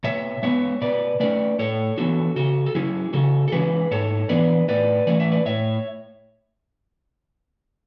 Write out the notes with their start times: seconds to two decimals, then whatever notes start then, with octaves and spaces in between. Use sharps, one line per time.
0.04 B2 C#5 E5
0.43 G#3 B3 C#5 E5
0.82 B2 B4 D5
1.20 A3 C#4 B4 D5
1.59 A2 A4 C#5
1.97 E3 B3 D4 F#4 A4
2.36 C#3 F#4 A4
2.66 A4
2.75 F#3 C#4 E4 G#4
3.13 C#3 F#4 A4
3.48 A4
3.52 E3 G#3 C#4 G#4 B4
3.91 G#2 A4 C#5
4.29 E3 B3 D4 B4 D5
4.68 A2 B4 D5
5.07 E3 A3 C#4 D5
5.20 E5
5.31 B4 D5
5.46 A2 C#5 E5